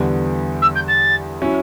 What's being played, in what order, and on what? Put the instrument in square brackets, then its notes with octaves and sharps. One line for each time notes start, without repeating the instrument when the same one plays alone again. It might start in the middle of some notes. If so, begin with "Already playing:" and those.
Already playing: [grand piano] E2 D3 G3 B3
[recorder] E6
G6
A6
[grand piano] F#3 C#4 E4